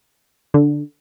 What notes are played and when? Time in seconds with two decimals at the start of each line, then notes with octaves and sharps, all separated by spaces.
0.54 D3